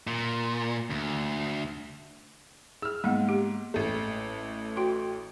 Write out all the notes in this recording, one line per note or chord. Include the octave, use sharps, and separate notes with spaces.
A#2
D2
G#4 E6 F6
G#2 A#3 B3 F#5
G4
A1 A3
F#4 G5 C6